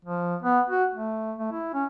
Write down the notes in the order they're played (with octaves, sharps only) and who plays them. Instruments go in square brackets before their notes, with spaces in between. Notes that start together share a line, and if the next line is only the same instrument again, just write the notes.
[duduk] F3
B3
F#4
A3
A3
E4
C#4